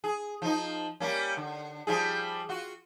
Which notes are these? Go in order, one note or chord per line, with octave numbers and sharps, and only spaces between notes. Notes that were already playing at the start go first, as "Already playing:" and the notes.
G#4
F3 D#4
G3 A#3 C#4
D3
F3 G3 G#4
F4 F#4